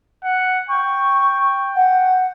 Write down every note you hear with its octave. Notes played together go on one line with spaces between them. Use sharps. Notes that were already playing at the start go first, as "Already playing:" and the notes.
F#5
G5 C#6
F#5